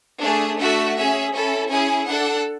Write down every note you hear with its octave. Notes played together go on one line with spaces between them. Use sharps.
A3 D4 G#4
A3 D4 F#4 A4 E5
C#4 G#4 E5
C#4 E4 A4
C#4 E4 G#4 G#5
D4 A4 F#5